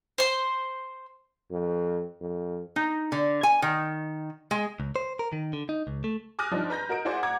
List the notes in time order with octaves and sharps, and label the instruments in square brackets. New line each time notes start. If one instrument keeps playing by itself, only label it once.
[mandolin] C5 C6
[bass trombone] F2
F2
[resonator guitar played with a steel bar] D#4
D3
G#5
D#3
G#3
[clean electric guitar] C#2
C5
A#4
D#3
D3
D#4
C#2
A3
[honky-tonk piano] G#5 D6 D#6 F6 F#6 A#6
F3 G3 D4 D#4
B4 A#5 G6 A#6
F#4 A#4 D#5 D7
E4 F#4 G#4 C5 D5 F#5
F#5 A#5 D6 G#6